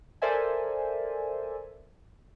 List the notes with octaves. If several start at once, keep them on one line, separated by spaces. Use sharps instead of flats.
A4 A#4 C5 D5 E5 G#5